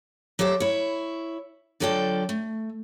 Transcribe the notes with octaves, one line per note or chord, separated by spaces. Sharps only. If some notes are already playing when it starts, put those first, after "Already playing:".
F#3 G4 A4 C5 E5
E4 C#5
D3 F#3 F4 A4 D5 G5
A3